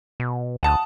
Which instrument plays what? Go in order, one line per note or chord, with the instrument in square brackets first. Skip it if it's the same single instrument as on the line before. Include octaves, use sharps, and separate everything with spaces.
[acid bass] B2
[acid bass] D2 [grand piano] F#5 A5 D#6